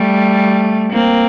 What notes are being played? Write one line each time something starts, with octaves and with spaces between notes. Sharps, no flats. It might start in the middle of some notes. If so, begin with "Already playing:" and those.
Already playing: G3 A3
A#3 C4